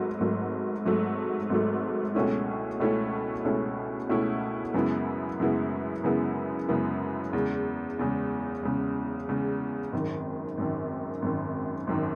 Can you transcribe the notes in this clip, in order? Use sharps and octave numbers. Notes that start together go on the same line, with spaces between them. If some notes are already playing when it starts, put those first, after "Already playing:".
Already playing: G#1 G#2 F#3 A3
G#1 G#2 F#3 A3
G#1 G#2 F#3 A3
G#1 G#2 F#3 A3
C#2 B2 A3 C#4 E4
C#2 B2 A3 C#4 E4
C#2 B2 A3 C#4 E4
C#2 B2 A3 C#4 E4
F#2 C#3 G#3 B3 E4
F#2 C#3 G#3 B3 E4
F#2 C#3 G#3 B3 E4
F#2 C#3 G#3 B3 E4
E2 C#3 G#3
E2 C#3 G#3
E2 C#3 G#3
E2 C#3 G#3
G#1 F#2 D#3
G#1 F#2 D#3
G#1 F#2 D#3
G#1 F#2 D#3